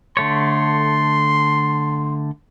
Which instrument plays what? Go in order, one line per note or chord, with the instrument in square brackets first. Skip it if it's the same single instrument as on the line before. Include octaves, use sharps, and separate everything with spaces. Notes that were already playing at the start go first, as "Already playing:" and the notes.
[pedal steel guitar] D3 A3 C#5 [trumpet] C6